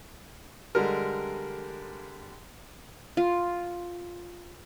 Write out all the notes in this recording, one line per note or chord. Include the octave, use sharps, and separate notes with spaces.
D3 G3 G#3 A#4
F4